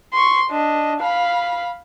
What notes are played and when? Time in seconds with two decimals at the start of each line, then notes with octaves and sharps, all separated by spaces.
0.13 C6 C#6
0.51 D4 D#5
1.01 F5 B5